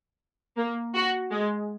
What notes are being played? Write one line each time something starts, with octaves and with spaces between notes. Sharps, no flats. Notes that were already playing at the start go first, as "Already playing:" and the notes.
A#3
F#4
G#3